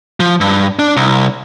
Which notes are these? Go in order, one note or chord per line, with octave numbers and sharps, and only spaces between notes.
F3
G2
D4
C2